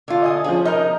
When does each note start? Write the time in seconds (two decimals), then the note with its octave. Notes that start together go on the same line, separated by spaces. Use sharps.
0.08 D3 F4
0.22 D#5 G#5 D#6
0.44 F3 C#4 G#4
0.65 D#4 A#4 D#5 F6 G6